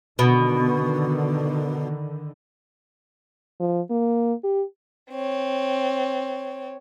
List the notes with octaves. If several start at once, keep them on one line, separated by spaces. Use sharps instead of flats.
B2 D3 D#3
F3
A#3
G4
C4 C#5